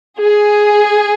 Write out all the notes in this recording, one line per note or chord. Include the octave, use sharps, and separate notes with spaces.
G#4